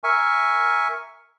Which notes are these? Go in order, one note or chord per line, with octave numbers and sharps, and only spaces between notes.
A#4 E5 G#5 C#6